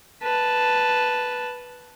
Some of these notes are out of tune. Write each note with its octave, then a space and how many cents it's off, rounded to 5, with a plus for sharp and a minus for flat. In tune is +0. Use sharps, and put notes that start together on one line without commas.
B4 +0 A5 +0